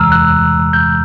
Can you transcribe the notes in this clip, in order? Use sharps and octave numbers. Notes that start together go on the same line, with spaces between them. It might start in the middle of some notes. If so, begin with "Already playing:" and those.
Already playing: E2 C3 E3 G#3 A#5 E6 F6
F#6
G6